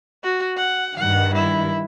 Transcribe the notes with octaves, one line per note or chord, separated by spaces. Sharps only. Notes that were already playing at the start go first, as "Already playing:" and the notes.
F#4
F#5
G2 D#3 F#5
E4